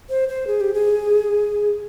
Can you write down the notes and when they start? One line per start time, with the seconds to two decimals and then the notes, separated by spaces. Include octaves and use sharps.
0.10 C5
0.29 C5
0.47 G#4
0.61 G4
0.74 G#4